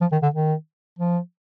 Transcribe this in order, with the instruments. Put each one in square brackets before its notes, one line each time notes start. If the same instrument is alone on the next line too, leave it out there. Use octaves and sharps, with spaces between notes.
[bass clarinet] F3
D#3
D3
D#3
F3